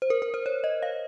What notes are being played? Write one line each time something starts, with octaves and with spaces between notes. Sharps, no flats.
C5
A#4
A#4
C5
C#5
D#5
F5